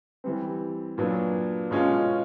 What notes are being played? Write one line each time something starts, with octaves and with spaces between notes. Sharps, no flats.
E3 G3 C4
A#2 F#3 B3 D4
B2 G#3 C#4 F4